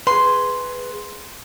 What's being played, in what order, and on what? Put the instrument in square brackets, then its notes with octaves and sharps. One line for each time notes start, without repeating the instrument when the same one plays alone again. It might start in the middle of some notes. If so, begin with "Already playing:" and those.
[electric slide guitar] G#4 B4 [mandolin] C6